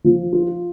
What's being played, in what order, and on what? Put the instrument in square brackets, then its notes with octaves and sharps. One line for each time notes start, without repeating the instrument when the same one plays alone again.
[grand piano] F3
F4